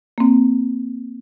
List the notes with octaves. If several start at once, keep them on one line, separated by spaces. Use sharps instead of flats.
A#3 C4